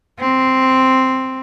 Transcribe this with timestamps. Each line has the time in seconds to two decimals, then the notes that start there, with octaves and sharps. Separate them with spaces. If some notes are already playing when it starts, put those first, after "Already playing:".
0.20 C4